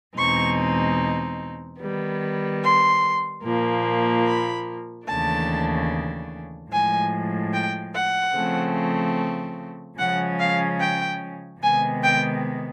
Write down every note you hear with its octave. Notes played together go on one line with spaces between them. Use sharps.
E2 B2 G#3 C4 D#4 C#6
D#3 G3 B3
C6
A#2 F3 A#3
B5
D#2 C#3 E3 A3 D4 A5
A2 F3 G#3 G#5
G5
F#5
C#3 F3 A3 C4
C#3 F3 G#3 C#4 F#5
F5
G5
C3 D#3 G#3 B3 G#5
G5